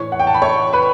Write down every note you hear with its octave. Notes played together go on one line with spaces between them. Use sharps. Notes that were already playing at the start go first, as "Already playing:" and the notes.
Already playing: A2 E3 C#5 C#6
F#5
G5
A5
B5
C#5 C#6
B4 B5